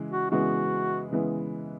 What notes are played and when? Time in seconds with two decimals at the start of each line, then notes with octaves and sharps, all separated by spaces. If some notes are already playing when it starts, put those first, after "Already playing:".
Already playing: C#3 E3 G#3
0.11 F#4
0.30 C#3 E3 G#3 B3 F#4
1.11 C#3 E3 G#3 B3